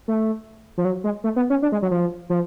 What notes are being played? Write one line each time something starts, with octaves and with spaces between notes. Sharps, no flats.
A3
F3
F#3
G#3
A3
B3
C#4
D4
G#3
F#3
F3
F3